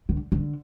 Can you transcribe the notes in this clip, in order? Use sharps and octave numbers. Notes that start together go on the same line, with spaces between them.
D3
D3